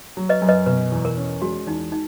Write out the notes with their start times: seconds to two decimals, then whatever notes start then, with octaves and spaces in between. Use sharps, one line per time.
0.17 F#3
0.29 B4 D#5
0.42 F#2
0.49 B4 D#5
0.66 B2 B4
0.92 E2
1.05 A#4
1.17 C#4
1.42 G#3 F#4
1.67 E2 D#4
1.92 D#4